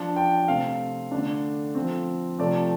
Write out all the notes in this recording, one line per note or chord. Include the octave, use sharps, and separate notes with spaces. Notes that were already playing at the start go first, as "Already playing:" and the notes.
Already playing: F3 D4 A5
G5
C3 A3 C4 F5
D3 A3 D4
F3 C4
C3 F3 A3 D5